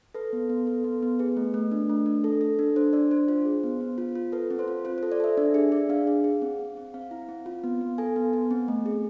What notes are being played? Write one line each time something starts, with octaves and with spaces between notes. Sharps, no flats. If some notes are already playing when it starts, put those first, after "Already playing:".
A4 B4
B3
B3
A4
B3
B3
G#4 B4
A3
A3
D4
A3
D4
A4
A4
D4
D4 C5
D4 D5
D4 C5
F4 C5
G#4
B3
B3
F4
F4
A4 B4
C4
C5
F4
F4 C5
A4 C5
D5
A4 E5
D4 D5
G#4 E5
G#4 D5
D4 F5
G#4
G#4
C4
C4
C4
C4 F5
E4
C4
F4
B3
B3
A4 G#5
B3
B3
C4
A3
G#4